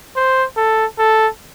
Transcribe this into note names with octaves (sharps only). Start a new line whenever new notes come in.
C5
A4
A4